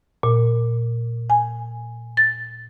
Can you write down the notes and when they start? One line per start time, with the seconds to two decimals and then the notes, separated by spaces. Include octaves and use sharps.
0.23 A#2
1.30 G#5
2.17 A6